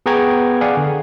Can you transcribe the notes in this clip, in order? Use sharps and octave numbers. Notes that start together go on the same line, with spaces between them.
B3 G#4 G5 A#5 C#6 G#6
G#4 D5 F5 F#5 G#5
D3